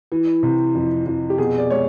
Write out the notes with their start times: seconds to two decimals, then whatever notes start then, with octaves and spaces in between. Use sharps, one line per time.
0.12 E3
0.43 C3
0.75 F2
1.06 F2
1.30 G4
1.38 B2 G#4
1.58 D5
1.70 G#3 C#5